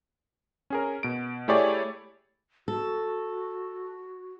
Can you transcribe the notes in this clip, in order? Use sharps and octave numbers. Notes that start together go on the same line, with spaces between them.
C#4 G#4 A#4
B2 D7
A3 E4 G4 G#4 C#5 D5
F#4 A4